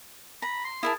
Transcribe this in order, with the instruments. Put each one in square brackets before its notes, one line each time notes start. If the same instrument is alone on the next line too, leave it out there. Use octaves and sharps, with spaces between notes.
[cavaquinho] A#5 [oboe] B5
[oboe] C6
[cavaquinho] E4 A#4 A5 [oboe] G#4